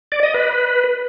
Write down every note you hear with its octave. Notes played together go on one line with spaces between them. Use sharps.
D5
D#5
B4